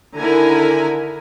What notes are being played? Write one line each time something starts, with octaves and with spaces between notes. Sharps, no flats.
D3 D#3 E4 A#4 G#5 A#5